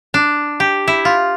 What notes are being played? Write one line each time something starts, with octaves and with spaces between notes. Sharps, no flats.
D4
G4
E4
F4